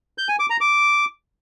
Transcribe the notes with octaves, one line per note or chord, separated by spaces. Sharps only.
G6
G#5
D6
A#5
D6